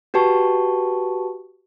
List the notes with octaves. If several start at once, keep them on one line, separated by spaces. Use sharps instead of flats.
F#4 G4 B4 A5 C#6